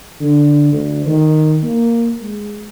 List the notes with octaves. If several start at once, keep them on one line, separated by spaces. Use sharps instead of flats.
D3
D2
D#3
A#3
G#3